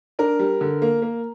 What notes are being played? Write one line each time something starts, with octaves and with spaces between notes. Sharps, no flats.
D4 A#4
G3
D3
A#3
A#3